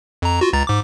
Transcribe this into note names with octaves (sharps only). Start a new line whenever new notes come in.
F2 A#5
F4 F#4
C#2 A#5 A6
G#2 D6